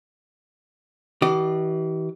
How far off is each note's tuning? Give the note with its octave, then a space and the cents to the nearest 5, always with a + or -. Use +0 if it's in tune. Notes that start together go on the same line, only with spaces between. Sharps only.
E3 -35 G4 -40 D5 +40